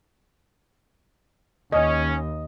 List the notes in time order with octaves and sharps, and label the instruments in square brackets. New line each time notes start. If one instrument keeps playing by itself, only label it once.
[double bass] D#2 [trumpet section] C#4 [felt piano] D#5